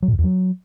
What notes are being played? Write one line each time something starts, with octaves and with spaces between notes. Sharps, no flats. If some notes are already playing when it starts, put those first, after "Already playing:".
F#3
A#2
G#2
E2
F#3